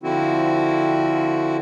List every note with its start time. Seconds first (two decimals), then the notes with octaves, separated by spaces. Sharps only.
0.03 D3 F3 C4 E4 F#4